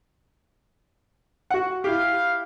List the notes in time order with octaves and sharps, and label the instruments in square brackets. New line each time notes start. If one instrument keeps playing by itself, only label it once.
[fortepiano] F#4 F#5
[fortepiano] E4 G4 [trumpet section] F5